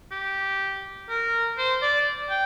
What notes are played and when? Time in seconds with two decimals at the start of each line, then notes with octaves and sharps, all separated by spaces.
0.11 G4
1.09 A#4
1.58 C5
1.82 D5
2.30 G5